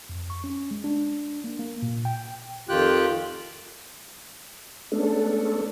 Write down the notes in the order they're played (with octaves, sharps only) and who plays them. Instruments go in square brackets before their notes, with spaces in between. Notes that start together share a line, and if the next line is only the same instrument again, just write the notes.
[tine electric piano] F2
C#6
C#4
G#3
D4
A#3
A#3
A#2
G5
[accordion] F2 D#3 F4 G4 G5 F#6
[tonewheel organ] G#3 A3 B3 C#4 D4 A4